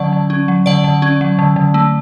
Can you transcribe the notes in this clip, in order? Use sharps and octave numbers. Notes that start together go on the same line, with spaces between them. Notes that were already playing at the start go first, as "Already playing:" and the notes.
Already playing: D3 F#3 C#4 D5 F#5
D3
C#4
F#3
D3 D5 F#5
D3
C#4
F#3
D3
D3
A3